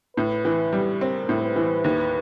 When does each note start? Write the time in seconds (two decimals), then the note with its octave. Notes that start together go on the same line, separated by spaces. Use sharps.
0.17 A2 B4
0.45 E3
0.73 G3
1.01 C4 A#4
1.29 A2
1.42 B4
1.56 E3
1.84 D#2